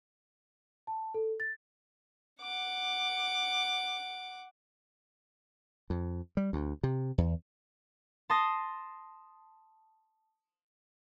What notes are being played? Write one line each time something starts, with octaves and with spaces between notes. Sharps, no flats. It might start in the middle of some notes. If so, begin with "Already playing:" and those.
A5
A4
A6
F#5 D6
F2
G3
D2
C3
E2
A5 C6 D#6 A#6